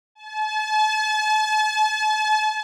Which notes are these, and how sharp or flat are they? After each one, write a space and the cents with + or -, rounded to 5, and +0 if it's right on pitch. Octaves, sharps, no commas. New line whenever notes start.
A5 -40